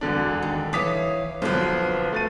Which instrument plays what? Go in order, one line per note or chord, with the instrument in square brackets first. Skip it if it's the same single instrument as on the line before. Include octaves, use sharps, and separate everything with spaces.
[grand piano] E1 D3 D4
[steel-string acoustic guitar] D#3
[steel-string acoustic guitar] E3 C#5 F5 [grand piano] D6 D#6 B6
[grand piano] B1 D3 F3 [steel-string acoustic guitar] B4 C5
[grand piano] A3 A6 D#7